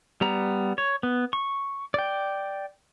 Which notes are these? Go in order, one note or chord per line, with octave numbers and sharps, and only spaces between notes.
G3 B3 A#5
C#5
B3
C#6
D5 G5